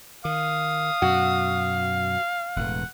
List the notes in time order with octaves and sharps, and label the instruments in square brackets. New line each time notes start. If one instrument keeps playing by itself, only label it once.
[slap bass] D#3 [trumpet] F5 [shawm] D#6
[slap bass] F#2 B2 [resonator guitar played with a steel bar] F#4
[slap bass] E1 A2 E3 [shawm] F#5